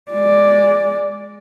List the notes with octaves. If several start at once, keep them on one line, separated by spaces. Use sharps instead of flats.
G#3 D5